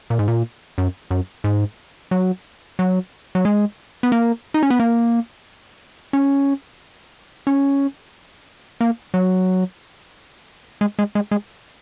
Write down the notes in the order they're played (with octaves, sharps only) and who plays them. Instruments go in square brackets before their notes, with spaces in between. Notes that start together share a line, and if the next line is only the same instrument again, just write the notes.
[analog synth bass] A#2
G#2
A#2
F#2
F#2
G#2
F#3
F#3
F#3
G#3
B3
A#3
D#4
C#4
B3
A#3
C#4
C#4
A#3
F#3
G#3
G#3
G#3
G#3